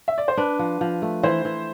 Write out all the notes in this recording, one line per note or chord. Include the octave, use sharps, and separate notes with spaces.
E5
D5
C5
D4 B4
F3
F3
A3
E3 C5
E3